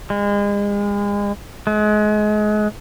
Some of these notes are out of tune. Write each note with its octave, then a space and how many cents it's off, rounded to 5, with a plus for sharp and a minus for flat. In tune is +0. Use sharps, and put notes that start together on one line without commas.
G#3 -35
G#3 +30